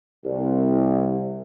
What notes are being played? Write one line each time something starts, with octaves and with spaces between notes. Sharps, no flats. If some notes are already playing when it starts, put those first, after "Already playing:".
C2